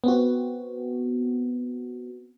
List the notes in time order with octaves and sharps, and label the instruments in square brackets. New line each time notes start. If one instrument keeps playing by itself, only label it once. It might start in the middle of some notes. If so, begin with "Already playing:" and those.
[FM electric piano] B3 C4 F#4